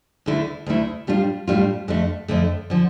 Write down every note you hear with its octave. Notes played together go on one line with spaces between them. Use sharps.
D2 D3 A3 E4
D2 D3 A3 E4
A2 G3 D4 F4
A2 G3 D4 F4
F2 D3 A3
F2 D3 A3
D3 F3